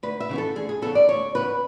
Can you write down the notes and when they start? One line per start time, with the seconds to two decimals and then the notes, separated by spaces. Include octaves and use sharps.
0.03 D2 B4
0.20 E5
0.29 C#3 E3 B3
0.38 A4
0.56 D2 G#4
0.69 G#4
0.82 C#3 E3 B3 A4
0.95 D5
1.08 D2 C#5
1.35 C#3 E3 B3 B4